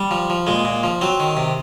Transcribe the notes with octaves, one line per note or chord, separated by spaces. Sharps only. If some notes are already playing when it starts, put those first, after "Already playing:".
Already playing: G3
F3
F3
A#2 G#3
A#2
F3
F#3 C4
D#3
C3